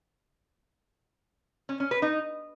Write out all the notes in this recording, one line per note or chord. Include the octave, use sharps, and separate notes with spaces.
C#4
C#4
B4
D#4